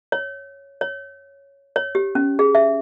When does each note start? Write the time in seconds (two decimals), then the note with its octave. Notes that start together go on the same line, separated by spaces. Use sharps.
0.12 C#5
0.81 C#5
1.76 C#5
1.95 G4
2.15 C#4
2.39 G#4
2.55 E5